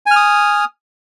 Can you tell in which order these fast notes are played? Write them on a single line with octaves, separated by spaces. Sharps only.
G#5 F6 D#6